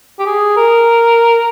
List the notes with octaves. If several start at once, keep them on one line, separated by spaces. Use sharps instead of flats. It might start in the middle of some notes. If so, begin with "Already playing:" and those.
G4
G#4
A#4